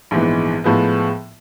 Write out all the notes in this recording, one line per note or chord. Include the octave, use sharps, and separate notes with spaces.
A#1 G#2 E3 G#3 B3
A2 F3 G#3 B3